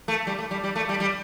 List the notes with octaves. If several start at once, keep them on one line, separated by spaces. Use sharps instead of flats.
A3
G3
A3
G3
G3
A3
G3
G3